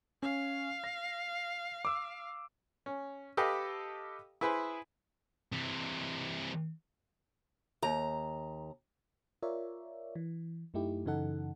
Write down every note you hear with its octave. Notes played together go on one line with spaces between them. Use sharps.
C#4 F5
A#6
D6 E6
C#4
G4 A4 B4 D#5 F5 G5
E4 G#4 B4 C5
C3 E3
D#2 A#5
F4 A#4 C#5 D5 E5
E3
F#2 A3 D#4 E4 G4
F#2 C#3 E3 D#4 A4 F#5